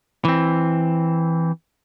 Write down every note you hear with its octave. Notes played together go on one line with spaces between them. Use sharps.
E3 C4